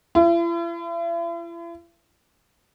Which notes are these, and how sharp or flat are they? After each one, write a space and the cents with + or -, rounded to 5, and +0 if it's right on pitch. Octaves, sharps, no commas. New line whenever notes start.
E4 +45